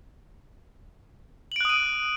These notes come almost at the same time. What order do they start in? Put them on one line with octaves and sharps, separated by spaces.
F#7 D7 F#6 D#6 D#7